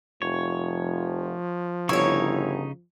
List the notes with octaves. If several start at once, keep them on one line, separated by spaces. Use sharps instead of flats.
F1 F3 C#5
G1 C#3 D#4 E4 C#5 C#6